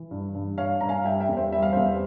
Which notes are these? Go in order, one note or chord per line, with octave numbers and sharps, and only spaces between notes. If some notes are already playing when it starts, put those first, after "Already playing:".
Already playing: E3
G2
G2
G2 C#5 F5
G2 A#5
F5 G#5
G3 E5 G5
E5 G5
E2
C5 E5
G3 E5
F5
E2 C5 E5